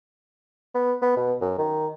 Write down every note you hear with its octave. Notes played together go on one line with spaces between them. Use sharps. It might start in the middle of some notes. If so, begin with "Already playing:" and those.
B3
B3
B2
F#2
D#3